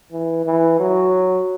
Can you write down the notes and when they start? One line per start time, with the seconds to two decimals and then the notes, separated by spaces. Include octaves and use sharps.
0.12 E3
0.46 E3
0.80 F#3